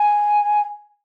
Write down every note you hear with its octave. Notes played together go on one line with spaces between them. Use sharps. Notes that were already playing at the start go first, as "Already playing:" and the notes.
Already playing: G#5